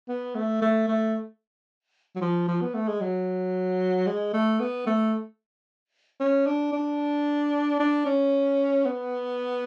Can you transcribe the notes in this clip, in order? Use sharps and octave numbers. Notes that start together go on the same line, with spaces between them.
B3
A3
A3
A3
F#3
F3
F3
B3
A3
G#3
F#3
G#3
A3
B3
A3
C#4
D4
D4
D4
C#4
B3